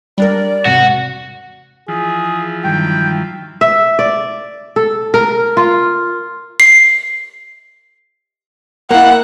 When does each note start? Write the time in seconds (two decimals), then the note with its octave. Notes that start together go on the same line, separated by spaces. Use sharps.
0.18 G3 D4 A#4 D5
0.65 E2 G#2 C3 F#4
1.88 E3 F3 G#4
2.64 G2 D#3 F#3 G5
3.61 E5
3.99 D5
4.76 A4
5.14 A#4
5.57 F4
6.60 C7
8.91 A#3 E4 F#5